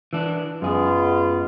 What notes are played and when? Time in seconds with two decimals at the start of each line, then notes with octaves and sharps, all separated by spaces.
0.13 E3 D4
0.62 F#2 G#3 B3 F4 G#4